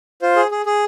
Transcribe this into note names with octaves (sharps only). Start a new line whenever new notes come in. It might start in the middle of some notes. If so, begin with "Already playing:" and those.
F4 C5
G#4
G#4
G#4